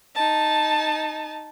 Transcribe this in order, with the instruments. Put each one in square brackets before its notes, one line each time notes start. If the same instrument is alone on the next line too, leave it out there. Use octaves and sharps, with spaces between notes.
[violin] D#4 A5